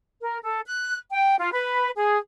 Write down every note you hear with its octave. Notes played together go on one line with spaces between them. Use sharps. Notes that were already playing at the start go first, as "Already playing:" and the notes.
A#4
A4
F#6
G5
F4
B4
G#4